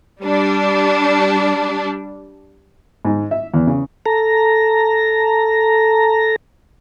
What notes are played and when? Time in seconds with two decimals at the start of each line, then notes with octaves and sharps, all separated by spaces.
0.23 G3 D4
3.05 G#2
3.31 E5
3.54 E2
3.67 C#3
4.06 A4 A#5